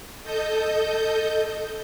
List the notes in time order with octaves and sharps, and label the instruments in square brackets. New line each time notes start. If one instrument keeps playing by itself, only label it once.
[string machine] A4 D#5 G6